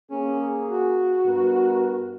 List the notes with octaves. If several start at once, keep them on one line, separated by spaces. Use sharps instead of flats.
A#3 C#4 G#4
F#4
G2 B3 A#4